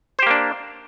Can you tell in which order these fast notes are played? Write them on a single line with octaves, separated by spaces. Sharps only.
C5 G4 A#3 D4